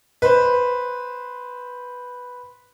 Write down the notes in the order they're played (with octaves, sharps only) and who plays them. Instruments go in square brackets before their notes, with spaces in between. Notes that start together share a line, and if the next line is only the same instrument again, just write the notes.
[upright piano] B4 C5